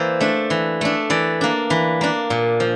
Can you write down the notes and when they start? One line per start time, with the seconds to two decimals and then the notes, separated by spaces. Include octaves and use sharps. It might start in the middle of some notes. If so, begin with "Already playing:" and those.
Already playing: E3 A#3 C5 D5
0.20 A3 D4
0.50 E3
0.81 A3 D4
1.10 E3 D5
1.41 A#3 D4
1.70 E3
2.01 A#3 D4
2.30 A#2
2.60 F3